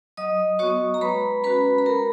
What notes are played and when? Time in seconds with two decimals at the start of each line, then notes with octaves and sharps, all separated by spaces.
0.17 F#3 D#5 D#6
0.59 B3 F#4 C#5 C#6
0.94 A#5
1.01 G#3 B4 B5
1.44 C#4 F#4 B4 B5
1.78 B5
1.86 G#3 A#4 A#5